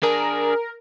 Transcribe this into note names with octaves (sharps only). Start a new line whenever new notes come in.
D4 G#4 A#4